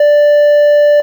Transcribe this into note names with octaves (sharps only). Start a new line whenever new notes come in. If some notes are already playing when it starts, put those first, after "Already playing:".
Already playing: D5